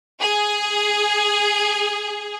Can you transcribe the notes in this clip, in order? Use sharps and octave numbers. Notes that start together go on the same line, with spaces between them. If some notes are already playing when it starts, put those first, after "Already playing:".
G#4